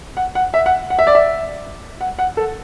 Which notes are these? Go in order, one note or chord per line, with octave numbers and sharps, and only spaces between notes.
F#5
F#5
E5
F#5
F#5
E5
D5
E5
F#5
F#5
A4